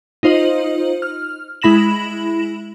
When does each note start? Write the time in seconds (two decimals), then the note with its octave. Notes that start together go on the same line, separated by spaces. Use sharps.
0.23 D#4 F4 C5 D#5 F#7
1.02 F6
1.62 G#3 E4 B5 A#6 E7 F#7